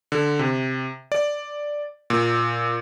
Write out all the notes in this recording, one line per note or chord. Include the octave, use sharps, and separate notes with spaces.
D3
C3
D5
A#2